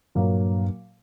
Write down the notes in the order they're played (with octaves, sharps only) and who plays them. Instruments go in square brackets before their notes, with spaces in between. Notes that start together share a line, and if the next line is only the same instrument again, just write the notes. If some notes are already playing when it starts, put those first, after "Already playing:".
[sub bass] G2 [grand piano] A#2 F#3 A#3